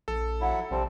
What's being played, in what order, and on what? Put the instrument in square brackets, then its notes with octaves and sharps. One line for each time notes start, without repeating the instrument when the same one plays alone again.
[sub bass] A#1 [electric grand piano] A4
[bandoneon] F#3 E4 [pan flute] F#5
[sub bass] A#1 [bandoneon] C3 G3 C4 [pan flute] A5